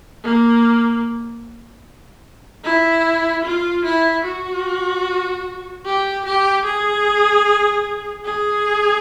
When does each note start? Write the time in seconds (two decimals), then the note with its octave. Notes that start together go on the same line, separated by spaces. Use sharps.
0.24 A#3
2.65 E4
3.45 F4
3.85 E4
4.25 F#4
5.85 G4
6.25 G4
6.65 G#4
8.25 G#4